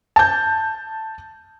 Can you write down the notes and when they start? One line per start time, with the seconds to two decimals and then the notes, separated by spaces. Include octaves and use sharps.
0.16 A5 G6